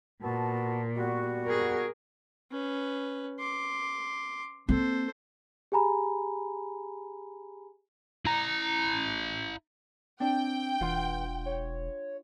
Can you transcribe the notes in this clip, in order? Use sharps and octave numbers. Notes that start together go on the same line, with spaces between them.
A#2 B3 F#4 A5
G3 B3 F#4
G#4 A#4
C#4 B4
C6 D6
A#3 C4 A4 C5
G4 G#4 G#5 A#5 B5
E4 A#5
C4 D4 G5
E1 E3 F4 F#5 C6
C#5